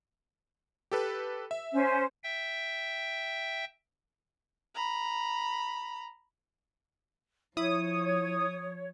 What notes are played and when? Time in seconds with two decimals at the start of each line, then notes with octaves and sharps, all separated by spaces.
0.91 G4 A4 B4
1.51 E5
1.73 C#4 C5
2.24 E5 G5
4.75 A#5 B5
7.57 F3 E4 C#5 D#6